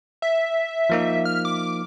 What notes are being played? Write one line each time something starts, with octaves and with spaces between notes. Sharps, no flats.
E5
F3 A#3 D#4
F6
D6